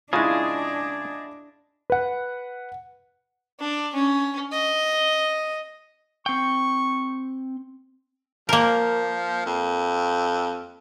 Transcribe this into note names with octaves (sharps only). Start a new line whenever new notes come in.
C#3 G#3 D4 E4 F4 G#4 D#5 A5
B4 F#5
D4
C#4
D#5
C4 G5 C#6
F3 A#3 A#4
F2